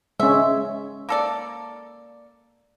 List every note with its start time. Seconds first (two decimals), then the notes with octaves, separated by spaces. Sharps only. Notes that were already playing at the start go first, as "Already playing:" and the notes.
0.20 G#3 C#4 E5
1.09 A#3 A4 D5